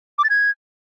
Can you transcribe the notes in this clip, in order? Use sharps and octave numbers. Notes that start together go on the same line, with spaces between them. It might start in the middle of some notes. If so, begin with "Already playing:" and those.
D6
A6
G#6